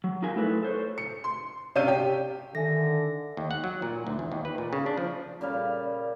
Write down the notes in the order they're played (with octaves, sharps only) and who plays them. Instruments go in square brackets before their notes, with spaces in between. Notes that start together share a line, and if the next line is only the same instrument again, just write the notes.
[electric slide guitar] F#3
D#4 F4 F#4 G#4 A#4 G#5
A3 E4 A4 B4
A4 C5 C#5
[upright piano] C#7
C6
C3 C#4 D4 F5 G6 D#7
G4
[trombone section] D3 [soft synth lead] D#3 [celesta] A4 E5 G#5 [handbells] A#6
[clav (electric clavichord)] D#2
F#5
F#3
A#2
D2
E2
D#2
B4
A#2
C#3
D4
F3
[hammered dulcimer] A#2 C#3 G3 F5